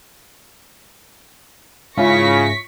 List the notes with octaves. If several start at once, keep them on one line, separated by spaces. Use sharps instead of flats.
G#2 C#3 C#4 E4 F4 C#6 A#6 B6